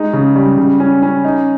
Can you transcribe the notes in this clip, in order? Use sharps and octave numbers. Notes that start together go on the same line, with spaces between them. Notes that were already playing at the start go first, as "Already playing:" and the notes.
Already playing: G#3 D#4
C#3
G3
C#3
C#4
C#4
D#4